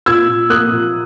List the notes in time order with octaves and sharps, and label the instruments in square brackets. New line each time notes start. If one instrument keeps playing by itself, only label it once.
[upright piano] A#2 E6 G#6
A#2
A#3 D#6 F#6
A#2